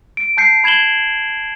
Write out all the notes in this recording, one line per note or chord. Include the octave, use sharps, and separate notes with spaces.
D7
A5 G6 C7 C#7
B5 G#6 E7 F#7 G7